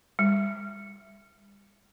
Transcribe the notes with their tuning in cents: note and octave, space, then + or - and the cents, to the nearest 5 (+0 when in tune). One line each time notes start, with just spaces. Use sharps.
G3 +45